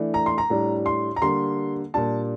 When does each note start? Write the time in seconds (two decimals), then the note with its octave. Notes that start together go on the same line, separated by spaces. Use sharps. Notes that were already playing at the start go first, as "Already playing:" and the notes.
Already playing: E3 A3 D4
0.14 A#5
0.26 C6
0.38 A#5
0.50 A2 G3 D4
0.86 C6
1.16 A#5
1.22 D3 G3 A#3 C6
1.94 A#2 G3 D4 A5